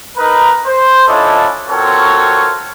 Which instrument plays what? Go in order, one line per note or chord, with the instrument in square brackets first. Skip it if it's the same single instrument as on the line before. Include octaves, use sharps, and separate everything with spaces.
[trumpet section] D#4 A#4 B4
C5
C#4 D4 E4 F4 A4 D#5
C4 F4 F#4 A4 A#4 C#5